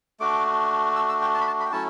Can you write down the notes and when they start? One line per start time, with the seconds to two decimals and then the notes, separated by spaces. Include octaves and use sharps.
0.20 A3 D4 F#4 D6
0.96 E6
1.09 E6
1.22 G5
1.35 A5
1.41 B5
1.47 A5
1.60 B5
1.66 G5
1.72 F#3 A3 C#4 E4 A5